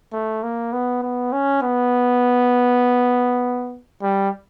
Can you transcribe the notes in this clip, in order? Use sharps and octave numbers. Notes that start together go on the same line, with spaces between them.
A3
A#3
B3
B3
C#4
B3
G3